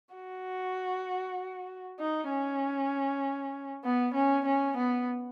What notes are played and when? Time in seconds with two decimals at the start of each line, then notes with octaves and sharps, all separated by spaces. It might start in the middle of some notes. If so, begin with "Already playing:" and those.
0.15 F#4
2.00 D#4
2.30 C#4
3.84 B3
4.14 C#4
4.46 C#4
4.77 B3